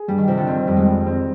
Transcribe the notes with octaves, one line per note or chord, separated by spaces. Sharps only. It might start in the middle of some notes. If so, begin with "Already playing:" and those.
Already playing: G#4
G2 G3
D#3
C3 F3
D3
D#3 C4
F2 G3
G#3
G3
C4